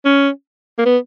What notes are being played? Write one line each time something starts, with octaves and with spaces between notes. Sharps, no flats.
C#4
A#3
B3